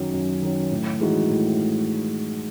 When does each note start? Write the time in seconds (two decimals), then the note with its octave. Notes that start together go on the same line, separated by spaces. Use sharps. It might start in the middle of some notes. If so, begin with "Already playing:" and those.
Already playing: F#2 D#3 F#3 C#4
0.13 F#2
0.42 D#3 F#3 C#4
0.71 A2
1.00 E3 G#3 D#4 F#4
1.29 A2